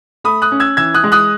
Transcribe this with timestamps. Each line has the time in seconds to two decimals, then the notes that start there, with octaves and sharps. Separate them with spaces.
0.24 A3 B5 D#6
0.42 D#6 F#6
0.52 C#4
0.60 E6 G#6
0.77 E3 E6 G#6
0.94 D#6 F#6
1.04 G#3
1.12 D#6 F#6